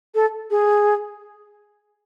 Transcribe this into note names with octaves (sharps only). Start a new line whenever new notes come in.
A4
G#4